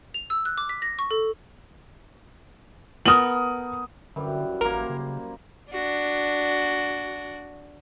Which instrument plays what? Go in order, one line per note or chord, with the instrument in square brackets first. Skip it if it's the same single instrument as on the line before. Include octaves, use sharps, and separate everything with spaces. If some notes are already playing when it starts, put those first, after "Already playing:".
[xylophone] F7
E6
F#6
D6
B6
A#6
C#6
A4
[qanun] B3 A4 A#4 [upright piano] D#6 F#7
[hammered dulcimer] F#2 E3 G3 [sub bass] D3
[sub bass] A1 [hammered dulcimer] A#3 C5 [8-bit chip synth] A#4
[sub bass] C#3
[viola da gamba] D4 F#4